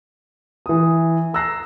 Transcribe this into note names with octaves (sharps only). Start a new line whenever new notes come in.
E3 D#6
A#5 E6 F#6 A#6 C7